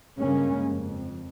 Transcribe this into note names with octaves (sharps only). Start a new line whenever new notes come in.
G2 C#3 G#3 A#3 C#4
F2